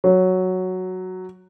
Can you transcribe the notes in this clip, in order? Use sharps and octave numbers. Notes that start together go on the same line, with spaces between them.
F#3